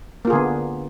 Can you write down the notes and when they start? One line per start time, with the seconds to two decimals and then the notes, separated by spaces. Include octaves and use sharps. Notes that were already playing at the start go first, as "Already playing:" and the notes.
0.25 A#3
0.27 F4
0.30 G#4
0.33 D3
0.35 B3